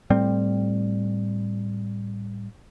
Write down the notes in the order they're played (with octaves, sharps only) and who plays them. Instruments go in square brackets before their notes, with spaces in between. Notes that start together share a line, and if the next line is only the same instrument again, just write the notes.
[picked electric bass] A2 G3 C4